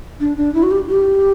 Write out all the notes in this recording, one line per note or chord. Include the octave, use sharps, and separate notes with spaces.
D4
D4
E4
F#4
G4
G4